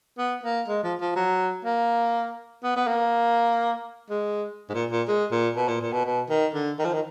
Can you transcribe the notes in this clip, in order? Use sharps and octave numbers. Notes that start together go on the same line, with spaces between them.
B3
A#3
G#3
F3
F3
F#3
A#3
B3
B3
A#3
G#3
G#2
A#2
A#2
G#3
A#2
B2
A#2
A#2
B2
B2
D#3
D3
D#3
F3
D#3